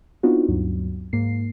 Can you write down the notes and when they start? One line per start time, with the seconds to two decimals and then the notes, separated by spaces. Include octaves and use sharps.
0.23 B3 C4 D4 D#4 F4 F#4
0.49 D2 G2 F#3
1.13 G#2 A#3 C7